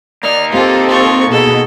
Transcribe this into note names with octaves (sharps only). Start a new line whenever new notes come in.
A#3 D#4 D5 F6
C4 F4 G4 A4
F4 C#6
B2 G#4 A4